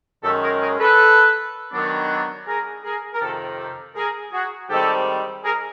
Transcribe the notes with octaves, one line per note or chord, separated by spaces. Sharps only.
F#2 D#3 G#3 C#4 G4 A4
G#4 A#4
G#4 A#4
A4 B4
D#3 F#3 B3 D4
G#4 A#4
G#4 A#4
A#4
F2 C3 D#3 G4 A4
G4 A4
G#4 A#4
F#4 G#4
G#2 D#3 G3 C4 D#4 G4 A4
G#4 A#4